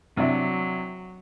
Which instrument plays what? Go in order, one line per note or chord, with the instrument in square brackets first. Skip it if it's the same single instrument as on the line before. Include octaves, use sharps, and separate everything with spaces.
[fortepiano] C3 D4 E4 [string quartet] F#3